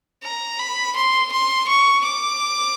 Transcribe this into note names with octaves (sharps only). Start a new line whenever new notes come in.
A#5
B5
C6
C6
C#6
D6